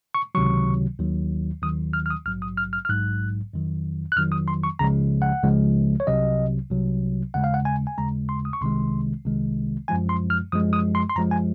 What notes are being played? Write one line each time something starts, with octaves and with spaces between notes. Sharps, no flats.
C#6
C#2 C3 D#3 F#3 C#6
D#2 D#3 F#3
D#2 D#3 F#3 D#6
F6
F6
D#6
A#1 G#2 F#3 F6
D#6
F6
F6
F6
A#1 G#2 F#3 F#6
F2 D#3 F#3
F#6
F2 D#3 F#3 F6
D#6
C6
C#6
C#2 C#3 F3 G#3 A#5
F#5
C#2 C#3 F3 G#3
C#5
C2 C3 F#3 D#5
C2 C3 F#3
D#2 C#3 G#3 F#5
F5
F#5
G#5
G#5
D#2 C#3 G#3 A#5
C6
D#6
C#6
C2 C3 D#3 G#3 C6
C2 C3 D#3 G#3
F#2 F3 G#3 G#5
C6
F6
F#2 F3 G#3 D#6
D#6
C6
C6
F#2 F3 G#3 A#5
G#5